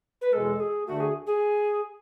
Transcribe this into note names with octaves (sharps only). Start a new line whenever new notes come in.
B4
E2 B2 G#3 A4
G#4
D2 D3 A3 F#4
G#4
G#4